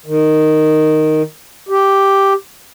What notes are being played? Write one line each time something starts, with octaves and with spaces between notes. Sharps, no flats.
D#3
G4